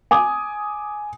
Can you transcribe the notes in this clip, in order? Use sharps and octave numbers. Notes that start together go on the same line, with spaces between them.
G#5 D6 D#6